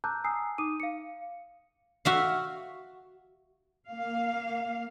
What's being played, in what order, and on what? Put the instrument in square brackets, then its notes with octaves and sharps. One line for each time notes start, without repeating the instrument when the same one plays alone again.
[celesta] A5 A#5 D6 E6 F#6 G6
G#5 A#5 D#6 E6 C7
D#4 D6 D#6 D#7
F5 C#7
[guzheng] F#4 E5 F5
[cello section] A#3 F5